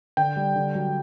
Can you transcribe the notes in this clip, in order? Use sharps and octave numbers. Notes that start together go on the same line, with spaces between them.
D3 G5
G3
D3
F#3